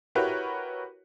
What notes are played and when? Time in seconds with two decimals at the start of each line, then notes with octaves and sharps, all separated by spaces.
0.15 E4 F#4 G4 A#4 B4 C#5